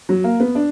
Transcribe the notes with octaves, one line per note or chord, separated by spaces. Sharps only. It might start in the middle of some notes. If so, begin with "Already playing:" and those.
F#3
A#3
B3
D4